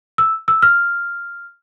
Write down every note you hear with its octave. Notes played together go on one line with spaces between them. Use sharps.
E6
E6
F6